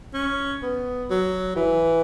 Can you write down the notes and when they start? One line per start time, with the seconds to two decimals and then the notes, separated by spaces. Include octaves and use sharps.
0.14 C#4
0.63 B3
1.10 F#3
1.56 E3